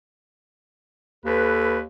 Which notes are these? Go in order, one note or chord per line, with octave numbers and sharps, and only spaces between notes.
D#2 A4 B4